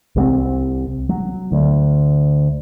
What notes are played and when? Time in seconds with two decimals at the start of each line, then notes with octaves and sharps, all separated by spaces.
0.16 C2 G3 C4
1.09 F#3
1.52 D2